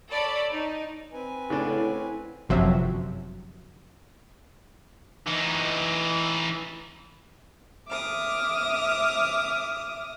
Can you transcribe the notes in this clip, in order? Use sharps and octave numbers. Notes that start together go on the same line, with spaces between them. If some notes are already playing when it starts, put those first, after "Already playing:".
A4 C#5 D5 B5
D#4
C4 B4 G#5
A2 C#3 D4 E4 C#5 F#5
G1 F#2 C3 F3 F#3 E5
E3 D#4
E5 D6 D#6 F6